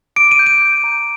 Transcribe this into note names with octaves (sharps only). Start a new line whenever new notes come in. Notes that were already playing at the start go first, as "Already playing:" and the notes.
D6 D7
D#7
G6
D#7
G6
A#5